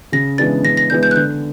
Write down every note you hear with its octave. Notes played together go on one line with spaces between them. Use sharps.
C#3 A#6
E3 G#3 B3 D4 A6
C#3 A#6
A#6
E3 G#3 B3 D4 G6
G6
F#6
D3 G6